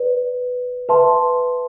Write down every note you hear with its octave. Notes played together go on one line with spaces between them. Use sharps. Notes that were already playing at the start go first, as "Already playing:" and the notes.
Already playing: B4 D5
B4 E5 A5 C6